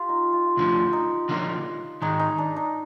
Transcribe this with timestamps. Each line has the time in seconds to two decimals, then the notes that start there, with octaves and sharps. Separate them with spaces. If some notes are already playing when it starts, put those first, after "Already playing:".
Already playing: F4 G4
0.09 D#4
0.33 F4
0.57 D2 D3 F3
0.93 D#4
1.29 D3 F3 A#3
2.02 G#2 D#3 G#3 D#4
2.19 D#4
2.38 D4
2.56 D#4